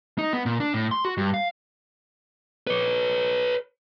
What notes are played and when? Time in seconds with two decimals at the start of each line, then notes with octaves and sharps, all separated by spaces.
0.18 D#4
0.33 B3
0.46 A#2
0.60 D4
0.74 A2
0.91 C6
1.05 F#4
1.17 G2
1.34 F5
2.67 B4 C#5